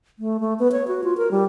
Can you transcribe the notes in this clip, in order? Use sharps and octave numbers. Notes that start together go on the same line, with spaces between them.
A3
A3
B3
C#5
F#4
F4
A#4
G3